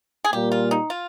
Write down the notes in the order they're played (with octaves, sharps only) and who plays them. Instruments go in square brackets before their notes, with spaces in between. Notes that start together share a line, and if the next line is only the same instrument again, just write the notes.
[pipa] G#4
[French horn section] A#2 G3 A#3 [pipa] G4
[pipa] F4
D#4
F4